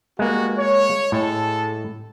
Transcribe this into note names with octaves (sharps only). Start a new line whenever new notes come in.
G3 G#3 A#3 B3 F#4
C#5
A2 G#3 A4